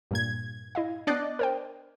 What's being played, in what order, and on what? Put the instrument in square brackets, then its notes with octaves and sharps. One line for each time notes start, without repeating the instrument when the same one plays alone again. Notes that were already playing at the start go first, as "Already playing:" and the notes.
[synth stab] G2 A#2 G#6
[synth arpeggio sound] E4 D#5 F5
[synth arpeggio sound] B3 F#6 C7 [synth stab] D4 D5 D#5
[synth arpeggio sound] A#4 C5 G5